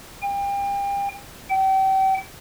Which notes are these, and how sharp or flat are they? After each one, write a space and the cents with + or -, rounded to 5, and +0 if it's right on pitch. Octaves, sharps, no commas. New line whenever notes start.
G5 +35
G5 -35